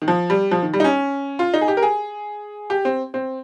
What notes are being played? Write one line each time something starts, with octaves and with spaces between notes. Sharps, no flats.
D#3
F3
G3
F3
D#3
G3
D#4
C#4
F4
D#4
G#4
G4
A#4
G#4
G4
C4
C4